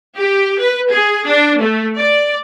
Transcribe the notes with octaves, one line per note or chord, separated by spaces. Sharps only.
G4
B4
G#4
D4
A3
D5